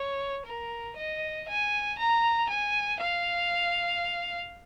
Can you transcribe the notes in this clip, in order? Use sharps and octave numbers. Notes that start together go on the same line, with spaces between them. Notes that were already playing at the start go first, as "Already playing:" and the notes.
Already playing: C#5
A#4
D#5
G#5
A#5
G#5
F5